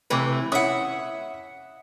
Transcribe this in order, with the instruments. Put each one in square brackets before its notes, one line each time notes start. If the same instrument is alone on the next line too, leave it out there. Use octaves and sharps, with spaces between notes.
[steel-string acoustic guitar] C3 E3 A3 [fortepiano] B4 D6
[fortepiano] C#4 E4 D#6 [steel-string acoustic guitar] E5 F#5